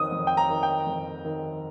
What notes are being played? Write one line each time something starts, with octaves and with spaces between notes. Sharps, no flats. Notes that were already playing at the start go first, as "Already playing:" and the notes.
Already playing: F2 D#3 D#6
F2
G5
A#5
D#3
G5
F2
D#3